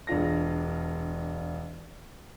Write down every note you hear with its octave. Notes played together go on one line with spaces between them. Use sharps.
E1 D4 F4 A#6